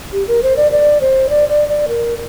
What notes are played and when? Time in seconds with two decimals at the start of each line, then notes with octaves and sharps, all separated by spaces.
0.13 G4
0.28 A#4
0.43 C5
0.57 D5
0.72 D5
1.01 C5
1.29 D5
1.49 D5
1.68 D5
1.88 A#4